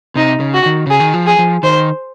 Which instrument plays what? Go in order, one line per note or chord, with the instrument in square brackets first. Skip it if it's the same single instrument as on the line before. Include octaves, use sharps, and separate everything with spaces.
[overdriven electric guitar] C3 [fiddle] D#4
[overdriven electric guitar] C#3
[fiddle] F#4
[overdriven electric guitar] D#3
[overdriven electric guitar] C#3 [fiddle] G#4
[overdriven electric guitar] D#3
F3
[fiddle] G#4
[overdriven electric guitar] F3
[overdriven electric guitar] D#3 [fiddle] C5